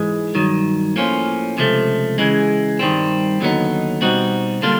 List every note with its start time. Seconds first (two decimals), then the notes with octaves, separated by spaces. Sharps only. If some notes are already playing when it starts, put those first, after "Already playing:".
Already playing: G#2 E3 G#3
0.35 G2 D#3 F#3
0.96 A2 F3 A#3 C#4 F4
1.57 C#2 C3 F3 A3
2.18 C#3 E3 G#3
2.79 G2 D#3 G3 C4
3.41 D#2 D3 F#3 B3 D#4
4.01 B2 G3 C4 D#4 F#4
4.62 D3 G3 A#3 D4 F4